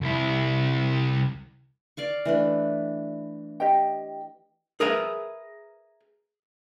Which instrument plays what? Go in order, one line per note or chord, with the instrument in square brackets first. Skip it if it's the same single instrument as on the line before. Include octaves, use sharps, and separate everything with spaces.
[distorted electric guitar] C2 E4
[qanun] D5 F5 C#6
E3 A3 D4
[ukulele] G4 D#5 G5
[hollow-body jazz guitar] G#4 A#4 B4 E5